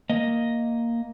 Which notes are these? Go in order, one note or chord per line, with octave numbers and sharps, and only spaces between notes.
A#3 D#5